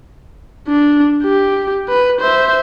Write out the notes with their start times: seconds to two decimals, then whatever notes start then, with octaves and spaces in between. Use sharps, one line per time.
0.68 D4
1.23 G4
1.89 B4
2.20 C5 E5